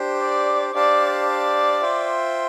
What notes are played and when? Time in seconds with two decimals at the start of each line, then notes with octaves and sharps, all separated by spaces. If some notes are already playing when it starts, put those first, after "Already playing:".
Already playing: D4 G4 C5
0.20 D5
0.74 D4 G4 C5 D5 F5 A5
1.28 D5
1.82 F4 C5 E5 G5